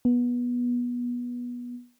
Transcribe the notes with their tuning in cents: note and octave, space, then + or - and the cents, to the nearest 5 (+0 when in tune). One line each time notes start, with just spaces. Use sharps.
B3 -20